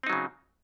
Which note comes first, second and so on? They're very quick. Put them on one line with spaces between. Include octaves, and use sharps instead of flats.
C4 D#4 F#3 C#3